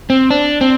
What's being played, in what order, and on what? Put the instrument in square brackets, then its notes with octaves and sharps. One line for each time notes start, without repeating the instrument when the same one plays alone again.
[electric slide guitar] C4
D4
C4